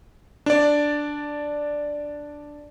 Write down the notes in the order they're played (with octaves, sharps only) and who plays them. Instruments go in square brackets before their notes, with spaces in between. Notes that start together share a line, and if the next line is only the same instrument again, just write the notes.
[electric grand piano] D4 D5